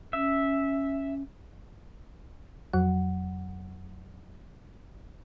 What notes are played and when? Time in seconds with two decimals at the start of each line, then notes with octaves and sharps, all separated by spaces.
0.13 C#4 E5
2.73 F2 F#3 F#5